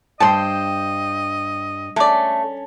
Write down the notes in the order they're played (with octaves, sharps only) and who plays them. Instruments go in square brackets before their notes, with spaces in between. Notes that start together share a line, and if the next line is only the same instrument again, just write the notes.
[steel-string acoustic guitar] G2 C5 G5 [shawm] D#5 [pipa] A5 C6
[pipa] G#3 D5 [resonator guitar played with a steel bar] A3 [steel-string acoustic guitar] C#4